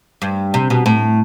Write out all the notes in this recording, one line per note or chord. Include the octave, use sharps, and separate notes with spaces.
G2
C3
B2
A2